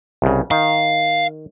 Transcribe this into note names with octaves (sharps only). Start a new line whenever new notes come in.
C2 C#3
D#3 F5